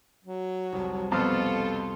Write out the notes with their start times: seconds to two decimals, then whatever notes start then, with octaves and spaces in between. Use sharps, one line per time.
0.24 F#3
0.72 C2 F2
1.12 F2 B2 F4 A4 C5 F5